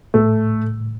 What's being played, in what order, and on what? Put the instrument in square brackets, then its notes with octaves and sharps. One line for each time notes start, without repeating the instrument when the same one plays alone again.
[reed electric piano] A2 [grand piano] A3